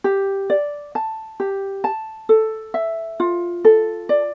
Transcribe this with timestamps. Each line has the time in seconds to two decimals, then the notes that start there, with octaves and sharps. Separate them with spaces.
0.04 G4
0.50 D5
0.95 A5
1.40 G4
1.84 A5
2.29 A4
2.74 E5
3.20 F4
3.65 A4
4.09 D5